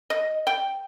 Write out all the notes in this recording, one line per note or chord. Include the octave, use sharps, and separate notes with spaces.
D#5
G5